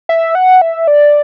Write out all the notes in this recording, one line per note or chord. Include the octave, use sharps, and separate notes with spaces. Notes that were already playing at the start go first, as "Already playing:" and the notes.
E5
F#5
E5
D5